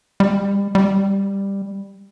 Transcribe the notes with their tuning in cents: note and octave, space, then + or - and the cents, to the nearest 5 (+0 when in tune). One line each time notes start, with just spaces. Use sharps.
G3 +35
G3 +10